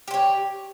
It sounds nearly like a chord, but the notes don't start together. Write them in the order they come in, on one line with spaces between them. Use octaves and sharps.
G4 C5 C#5